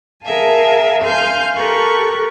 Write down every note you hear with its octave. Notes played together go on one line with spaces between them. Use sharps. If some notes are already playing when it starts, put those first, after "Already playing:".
G#4 A#4 E5 F5 G#5 A5
F5 G#5 C6 F6 G6
G4 A4 A#4 C#6 F#6